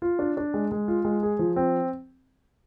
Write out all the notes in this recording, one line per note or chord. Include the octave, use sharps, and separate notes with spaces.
F4
D4
D4
G#3
G#3
F4
G#3
G#4
F3
C4